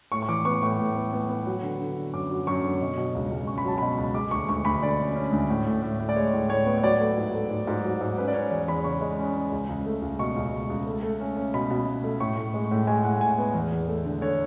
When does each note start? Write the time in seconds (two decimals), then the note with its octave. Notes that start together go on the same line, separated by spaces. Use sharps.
0.12 A2 C#6
0.22 C#6
0.29 E3 D6
0.45 B3 C#6
0.62 A2 C#6
0.79 A2
0.96 B3
1.13 B3
1.29 B3
1.46 F#3
1.62 D3
1.79 D3
1.96 D3
2.13 F#2 D6
2.31 F#3
2.47 F#2 C#6
2.64 D3
2.81 B2
2.97 B2
3.15 C#2
3.31 C#2
3.47 C#4 C#6
3.58 B5
3.65 F#3 A5
3.78 B2 B5
3.98 C#2
4.14 G#3 D6
4.31 D2 C#6
4.48 D2 C#6
4.65 D2 B5
4.83 D3 D5
4.99 C#4
5.16 C#4
5.32 D2
5.49 A2
5.66 A2
5.83 A2
5.99 A2
6.09 D5
6.16 G#3 C#5
6.33 A2
6.49 A2 C#5
6.66 B3
6.78 C#5
6.83 F#3 D5
7.01 A3
7.18 G#2
7.34 A3
7.50 G#2
7.67 G#2
7.84 F#3
8.01 G#2
8.18 C#4 B4
8.28 D5
8.34 C#4 C#5
8.51 E2 D5
8.68 E2 B5
8.84 C#3 C#6
9.01 G#3
9.19 C#4
9.35 C#4
9.52 C#2
9.69 C#2
9.86 A3
10.02 C#2
10.19 B2 C#6
10.36 C#2
10.52 B2
10.69 C#2
10.87 A3
11.03 A3
11.20 C#4
11.37 C#4
11.53 B2 B5
11.70 B2
11.88 B2
12.04 A3
12.20 A2 C#6
12.37 A2
12.54 G#3
12.71 A2
12.87 G#3 G#5
13.04 A2 F#5
13.21 A2 G#5
13.38 B3
13.55 E2
13.72 E2
13.88 A3
14.05 D3
14.21 D3 C#5